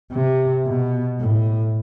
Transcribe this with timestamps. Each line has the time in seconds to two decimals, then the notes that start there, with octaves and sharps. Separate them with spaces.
0.12 C3
0.67 B2
1.21 A2